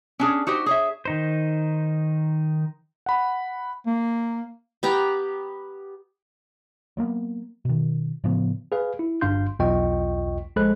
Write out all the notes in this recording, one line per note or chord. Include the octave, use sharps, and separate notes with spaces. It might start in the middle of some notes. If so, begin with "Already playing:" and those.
C#4 D4 G#4
D#4 F#4 G4 C5
G#4 C#5 E5
D#3 D#4 C5
F#5 B5
A#3
B3 G4 A#5
F#3 G#3 A#3 B3
B2 D#3
A2 C#3 F3 B3
G#4 B4 F5
E4
G1 G2 D4 F5 C6 G6
B1 E2 F4 D#5 G5 C#6
A#1 G#3 A4 C5 B5 F#6